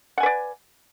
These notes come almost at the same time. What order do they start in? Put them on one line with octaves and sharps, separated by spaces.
F#5 G#5 B4 D5